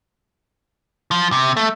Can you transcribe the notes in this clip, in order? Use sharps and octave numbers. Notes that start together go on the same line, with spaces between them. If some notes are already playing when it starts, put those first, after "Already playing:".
F3
C3
A3